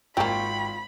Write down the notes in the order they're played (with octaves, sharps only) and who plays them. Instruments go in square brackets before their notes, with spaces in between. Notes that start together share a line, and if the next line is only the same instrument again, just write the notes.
[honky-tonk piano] G#1 G5 C#6 [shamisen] A#3 C4 [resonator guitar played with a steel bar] F4 [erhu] B5